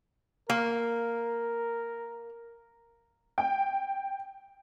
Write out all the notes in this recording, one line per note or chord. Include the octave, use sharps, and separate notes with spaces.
A#3 A#4
G5